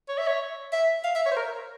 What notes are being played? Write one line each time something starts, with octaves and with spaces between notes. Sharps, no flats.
C#5
E5
C#5
E5
F5
E5
C#5
C5
A#4